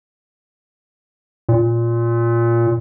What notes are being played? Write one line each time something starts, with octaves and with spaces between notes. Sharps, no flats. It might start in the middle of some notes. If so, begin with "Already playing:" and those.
A#2